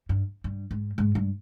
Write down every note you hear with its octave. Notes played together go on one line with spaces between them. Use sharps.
G2
G2
G#2
G#2
G2